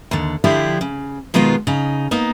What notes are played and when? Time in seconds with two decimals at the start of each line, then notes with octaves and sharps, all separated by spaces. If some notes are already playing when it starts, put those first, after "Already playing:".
0.11 D#2 D3
0.44 D3 F3 D4 E4 G4
0.81 C#3
1.34 B2 D#3 G#3 B3 F4
1.67 C#3 D#4
2.11 A#3 B3 D#4